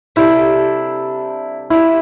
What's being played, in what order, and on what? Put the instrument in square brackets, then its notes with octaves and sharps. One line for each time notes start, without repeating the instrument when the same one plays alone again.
[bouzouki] C3 G3 D4 A4 [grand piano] E4
[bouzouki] G3 D4 F4 [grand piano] E4